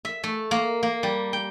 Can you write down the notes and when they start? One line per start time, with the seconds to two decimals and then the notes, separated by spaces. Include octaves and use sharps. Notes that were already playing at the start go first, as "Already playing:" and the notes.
0.05 E5
0.24 A3
0.51 A#3
0.83 A#3
1.03 G3
1.33 G5